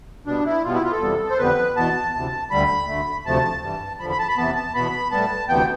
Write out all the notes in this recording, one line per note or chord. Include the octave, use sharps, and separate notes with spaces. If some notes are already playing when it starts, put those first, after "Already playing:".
B2 G3 B3 D4
E4
B2 G3 B3 F4
E4
F4
A4
E2 C3 G3 B3
C5
F2 D3 G3 B3 B4
E2 B2 B3 A5
D2 C3 E3
D2 D3 G3 B5
D2 D3 A3
D2 C3 F3 A3 A5
G2 E3 G3
E2 D3 F3 B5
B5
A5
B5
E2 C3 E3 B3 A5
A5
E2 B2 B3 B5
A2 G3 B3 A5
D2 C3 E3 B3 G5